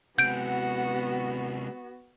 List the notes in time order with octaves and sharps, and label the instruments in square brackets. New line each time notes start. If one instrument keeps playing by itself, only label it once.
[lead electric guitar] C3 G#3 [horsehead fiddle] B3 F#4 [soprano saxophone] F#5 [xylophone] G6 D7